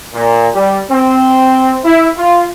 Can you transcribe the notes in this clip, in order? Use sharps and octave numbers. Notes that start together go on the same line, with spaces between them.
A#2
G3
C4
E4
F4